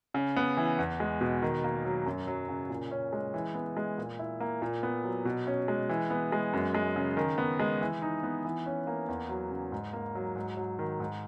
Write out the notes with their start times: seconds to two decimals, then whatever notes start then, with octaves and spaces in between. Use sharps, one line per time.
0.14 C#3
0.36 B3
0.57 E3
0.79 E2
1.00 G#3
1.21 B2
1.42 D#3
1.64 A#3
1.85 F#3
2.06 F#2
2.27 F#3
2.49 C#3
2.70 A#2
2.91 C#4
3.13 G#3
3.34 E3
3.55 B3
3.77 G#3
3.98 A#2
4.19 E4
4.40 A#3
4.62 A#2
4.83 B3
5.04 F#3
5.25 B2
5.47 C#4
5.68 G#3
5.89 E3
6.10 B3
6.32 G#3
6.53 F#2
6.75 G#3
6.96 C#3
7.17 D#3
7.38 B3
7.60 G#3
7.81 E3
8.02 D#4
8.23 B3
8.45 E3
8.66 C#4
8.87 A#3
9.08 E2
9.30 F#3
9.51 C#3
9.72 G#2
9.93 A#3
10.15 F#3
10.36 G#2
10.57 F#3
10.79 D#3
11.00 G#2